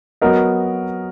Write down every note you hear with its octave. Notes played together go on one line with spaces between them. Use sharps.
F#3 B3 F#4 A#4 D#5